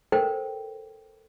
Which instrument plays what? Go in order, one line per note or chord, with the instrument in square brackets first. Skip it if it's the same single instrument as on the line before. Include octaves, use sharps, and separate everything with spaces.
[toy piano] A4 A#4 C5 G5